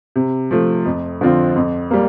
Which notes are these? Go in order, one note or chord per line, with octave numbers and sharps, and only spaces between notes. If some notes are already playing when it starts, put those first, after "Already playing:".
C3
F3 A3
F2
D3 F3 C4 F4
F2
G3 A#3